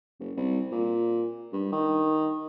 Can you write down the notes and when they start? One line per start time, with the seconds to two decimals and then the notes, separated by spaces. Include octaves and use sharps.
0.20 F#1
0.37 C2
0.72 A#2
1.52 G2
1.72 D#3